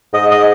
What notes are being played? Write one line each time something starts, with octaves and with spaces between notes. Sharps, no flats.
G#2 D#5
D#5